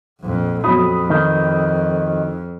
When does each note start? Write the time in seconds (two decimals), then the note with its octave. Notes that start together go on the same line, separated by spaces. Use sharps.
0.21 A#1 F2
0.64 F2 F#3 B5 D#6
1.10 D#3